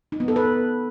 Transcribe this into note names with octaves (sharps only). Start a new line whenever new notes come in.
D#4
B3
A4
B4